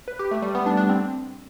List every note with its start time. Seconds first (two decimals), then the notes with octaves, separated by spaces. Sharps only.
0.08 B4
0.19 G4
0.31 A3
0.42 G3
0.55 B3
0.66 D4
0.77 D4
0.89 C4